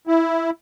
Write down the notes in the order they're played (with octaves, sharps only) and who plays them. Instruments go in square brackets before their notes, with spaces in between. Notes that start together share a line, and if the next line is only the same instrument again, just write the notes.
[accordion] E4